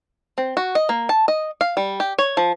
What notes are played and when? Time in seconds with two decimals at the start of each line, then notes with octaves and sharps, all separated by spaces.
0.38 C4
0.57 F#4
0.75 D#5
0.89 A#3
1.09 A5
1.28 D#5
1.61 F5
1.77 G3
2.00 G4
2.19 C#5
2.37 F3